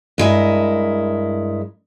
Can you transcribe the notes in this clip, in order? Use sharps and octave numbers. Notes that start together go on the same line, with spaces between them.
G2 G#3 E4 A#4